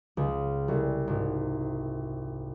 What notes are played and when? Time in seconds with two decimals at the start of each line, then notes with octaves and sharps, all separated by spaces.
0.17 C#2
0.68 C2
1.07 G#1